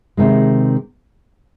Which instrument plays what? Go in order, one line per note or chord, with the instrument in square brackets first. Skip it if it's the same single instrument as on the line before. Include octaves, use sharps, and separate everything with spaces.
[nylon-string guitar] C3 D#3 G#3